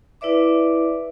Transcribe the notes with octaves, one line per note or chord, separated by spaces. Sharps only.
E4 B4 D5 E5 D6